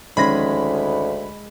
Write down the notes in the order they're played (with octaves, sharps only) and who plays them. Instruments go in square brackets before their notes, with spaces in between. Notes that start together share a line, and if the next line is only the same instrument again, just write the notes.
[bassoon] D2 [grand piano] D#3 C#4 A#6 [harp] G#3 [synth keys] B5